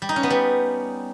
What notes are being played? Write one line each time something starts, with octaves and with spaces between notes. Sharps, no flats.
G3
D#4
C#4
B3
G3